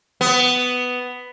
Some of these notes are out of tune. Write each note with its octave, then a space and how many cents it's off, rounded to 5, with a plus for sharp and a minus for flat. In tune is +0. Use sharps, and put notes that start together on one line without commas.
B3 +10